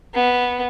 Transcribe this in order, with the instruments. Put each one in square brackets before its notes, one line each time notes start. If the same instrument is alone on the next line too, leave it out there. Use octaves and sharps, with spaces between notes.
[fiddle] B3